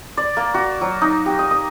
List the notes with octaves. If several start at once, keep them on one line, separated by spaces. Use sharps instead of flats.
D5
A#3
F#4
F#3
D#4
G4
D#5
D#5